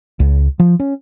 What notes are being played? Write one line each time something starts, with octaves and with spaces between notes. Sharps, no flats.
C#2
F3
C#4